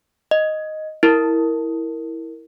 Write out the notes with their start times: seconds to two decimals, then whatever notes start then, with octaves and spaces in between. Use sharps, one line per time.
0.31 D#5
1.03 E4 A#4